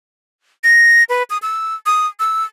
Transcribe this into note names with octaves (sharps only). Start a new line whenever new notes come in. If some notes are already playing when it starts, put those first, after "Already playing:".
A#6
B4
D#6
E6
D#6
E6